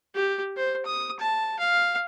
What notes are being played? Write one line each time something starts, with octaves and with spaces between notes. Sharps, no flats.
G4
C5
D#6
A5
F5